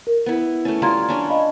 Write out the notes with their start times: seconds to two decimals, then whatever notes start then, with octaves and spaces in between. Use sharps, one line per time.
0.07 A#4
0.26 B3 E4
0.65 A3 C#4
0.82 G3 F4 A#4 A#5 C6 G#6
1.09 C#4 D4 C#5
1.28 D#5 F5 B5